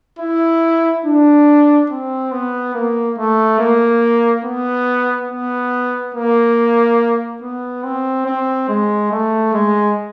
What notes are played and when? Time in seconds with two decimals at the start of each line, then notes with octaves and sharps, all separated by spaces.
0.19 E4
1.05 D4
1.90 C4
2.32 B3
2.74 A#3
3.17 A3
3.59 A#3
4.44 B3
5.30 B3
6.15 A#3
7.42 B3
7.83 C4
8.26 C4
8.69 G#3
9.12 A3
9.54 G#3